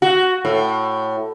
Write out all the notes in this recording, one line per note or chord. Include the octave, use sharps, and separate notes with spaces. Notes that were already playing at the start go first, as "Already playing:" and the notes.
F#4
A2